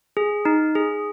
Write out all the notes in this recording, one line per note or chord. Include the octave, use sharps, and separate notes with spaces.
G#4
D#4
G#4